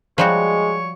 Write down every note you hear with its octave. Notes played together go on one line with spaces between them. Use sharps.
F3 G3 G#3 F#4 C#5